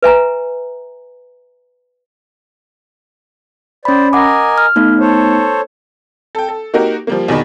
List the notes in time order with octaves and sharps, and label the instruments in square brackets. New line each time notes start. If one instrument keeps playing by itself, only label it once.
[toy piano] B4 E5 G#5 A#5
[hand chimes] C#4 B5 [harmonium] C5 D5
[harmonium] A#4 D#5 G#5 [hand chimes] F#5 D6
[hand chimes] F6
A3 B3 D#4
[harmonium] A4 C5 C#5
[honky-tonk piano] A4 G5
A4
A#3 D#4 F#4 G4 A#4
F3 G3 A#3
E2 B2 D#3 B5